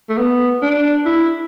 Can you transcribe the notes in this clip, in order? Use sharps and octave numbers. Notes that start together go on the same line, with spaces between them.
A3
B3
D4
E4